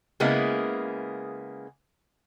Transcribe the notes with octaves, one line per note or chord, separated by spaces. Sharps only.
C#3 G#3 A#3 B3 E4